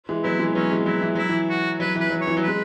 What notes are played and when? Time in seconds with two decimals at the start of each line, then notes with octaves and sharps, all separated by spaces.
0.09 E3 G#3
0.23 F#3 B3 E4
0.39 E3 G#3
0.55 F#3 B3 C#4
0.71 E3 G#3
0.86 F#3 E4
1.01 E3
1.15 F#3 E4
1.29 E3
1.49 F#4
1.80 F#3 B4
1.95 E3
2.00 B4
2.10 F#3
2.21 C#5
2.27 E3
2.37 F#3
2.42 B4
2.48 G#3